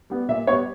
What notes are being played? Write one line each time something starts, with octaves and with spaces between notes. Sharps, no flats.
G3 B3
A#2 E5
G3 B3 C#5